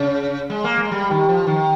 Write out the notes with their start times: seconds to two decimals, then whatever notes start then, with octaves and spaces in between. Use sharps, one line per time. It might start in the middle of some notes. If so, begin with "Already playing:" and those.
Already playing: C#3
0.50 G#3
0.64 A#3
0.78 G#3
0.92 G3
1.10 D#3
1.29 F3
1.47 D#3